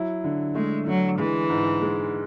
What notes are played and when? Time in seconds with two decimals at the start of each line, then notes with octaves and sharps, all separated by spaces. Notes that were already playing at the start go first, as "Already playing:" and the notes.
Already playing: F#3 E4
0.24 D3
0.55 G#3 A3
0.87 D3 F#3
1.19 E3 G#3
1.50 G#2
1.82 G#3